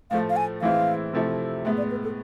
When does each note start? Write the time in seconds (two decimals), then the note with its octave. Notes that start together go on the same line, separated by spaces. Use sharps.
0.11 A2 F3 A3 F5
0.30 F5
0.36 G#5
0.62 A2 E3 G#3 C4 E4 F5
1.13 C3 F3 A3 E4
1.65 A2 G#3 B3 E5
1.78 D5
1.91 B4
2.04 A4